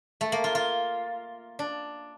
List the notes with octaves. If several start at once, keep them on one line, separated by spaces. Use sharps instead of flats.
A3
A#3
F4
F4
D4